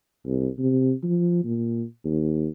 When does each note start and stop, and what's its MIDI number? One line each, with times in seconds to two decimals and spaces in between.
0.26 0.48 36
0.59 0.93 48
1.04 1.43 53
1.44 1.84 46
2.05 2.48 39